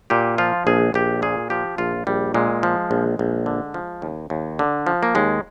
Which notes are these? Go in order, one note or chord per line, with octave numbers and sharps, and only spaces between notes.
A#2 G4
F3 F4
A#1 G#4
A#1 G4
A#2 G#4
F3 G4
A#1 F4
A#1 G3
A#2 G#3
F3
A#1
A#1
D3
F3
D#2
D#2
D3
F3
A#3
D#2 G#3